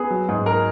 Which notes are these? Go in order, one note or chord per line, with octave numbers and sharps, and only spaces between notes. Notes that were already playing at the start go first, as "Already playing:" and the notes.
Already playing: B3 G#4
F#3
G#2
A#4